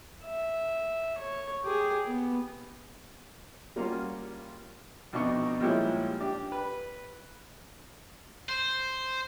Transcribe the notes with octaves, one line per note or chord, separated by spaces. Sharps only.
E5
C#5
G4 G#4
B3
G3 A#3 C#4 F4 F#4 F5
F2 B2 D4 D#4 C#6
A#2 F3 G3 G#3 C#4 E4
D4 G4
B4
C5